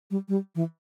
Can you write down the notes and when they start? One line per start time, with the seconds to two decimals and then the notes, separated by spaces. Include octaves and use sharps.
0.11 G3
0.29 G3
0.55 E3